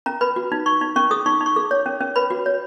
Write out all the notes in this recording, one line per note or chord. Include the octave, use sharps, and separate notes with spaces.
C#4 A#5
B4 B5
F#4
D#4
D#4 C#6
D#4
C#4 C#6
G#4 D#6
D#4 C#6
D#4
C#6
G#4
C#5
C#4
C#4
B4 B5
F#4
C#5